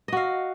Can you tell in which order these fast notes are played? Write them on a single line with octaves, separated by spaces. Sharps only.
D#5 F#4 F5